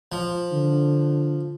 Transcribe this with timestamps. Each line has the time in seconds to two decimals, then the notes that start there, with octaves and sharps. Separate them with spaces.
0.12 F3
0.52 D3